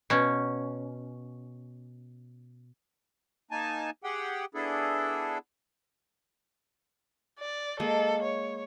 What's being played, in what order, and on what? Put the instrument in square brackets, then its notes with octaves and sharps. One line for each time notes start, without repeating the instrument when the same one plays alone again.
[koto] B2 C#4
[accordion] A#3 D#4 G#5 A5
G4 G#4 F#5 G5
B3 D4 E4 G#4 A4
[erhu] D5
[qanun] G#3 A#3 [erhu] A4
[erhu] C#5